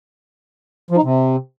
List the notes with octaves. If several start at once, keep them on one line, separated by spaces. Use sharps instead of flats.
F3
D#4
C3